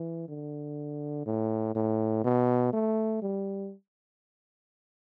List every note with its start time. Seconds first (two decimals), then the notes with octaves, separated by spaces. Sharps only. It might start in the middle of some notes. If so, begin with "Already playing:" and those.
Already playing: E3
0.28 D3
1.26 A2
1.75 A2
2.24 B2
2.73 A3
3.22 G3